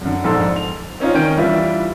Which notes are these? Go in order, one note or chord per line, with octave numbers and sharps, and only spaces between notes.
F#2 D3
A#1 F2 G#2 D4 A4 C6
F7
C4 C#4 D#4 F4
D#3 C#4 G5 G6 D7
E3 G3 D4 F4 E5